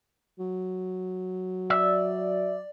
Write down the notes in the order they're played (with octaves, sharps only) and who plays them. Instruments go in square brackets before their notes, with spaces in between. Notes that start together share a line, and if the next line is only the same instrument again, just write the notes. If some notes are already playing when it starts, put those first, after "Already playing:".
[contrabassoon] F#3
[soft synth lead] D5 [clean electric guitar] E5